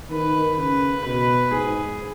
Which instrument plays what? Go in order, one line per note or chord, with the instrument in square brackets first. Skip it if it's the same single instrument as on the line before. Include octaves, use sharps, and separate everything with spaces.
[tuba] D#3 [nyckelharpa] B4
[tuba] C#3 [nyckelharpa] B4
[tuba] B2 [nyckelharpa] B4
[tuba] G#2 [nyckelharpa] G#4